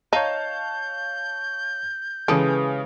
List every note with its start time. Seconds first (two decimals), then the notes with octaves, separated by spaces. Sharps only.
0.13 D#4 C#5 F5 A5 G6
2.28 C#3 E3 G#3 G4 A4 D#6 D7